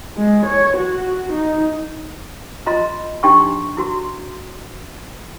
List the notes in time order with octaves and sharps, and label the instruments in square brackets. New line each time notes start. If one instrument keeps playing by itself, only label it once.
[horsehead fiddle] G#3
C#5
F#4
D#4
[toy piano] F4 D#5 A#5 C6
D4 D#4 G4 G5 C6 C#6
E4 F#4 C6